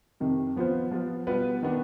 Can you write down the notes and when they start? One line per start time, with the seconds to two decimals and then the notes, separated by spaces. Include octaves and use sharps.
0.20 F2 C3 D#3
0.56 F3 B3 F4 C5
0.91 F3 B3 F4
1.27 B2 G3 B3 F4 B4
1.63 D#3 B3 D4